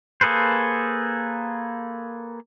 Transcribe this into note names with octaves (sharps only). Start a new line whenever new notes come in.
A#3 G#4 A4 B4 C5